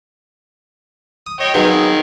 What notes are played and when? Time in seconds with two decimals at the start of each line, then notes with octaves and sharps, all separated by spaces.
1.27 D#6
1.40 C#5 D#5 G5
1.54 D#3 F#3 B3 F4 G#4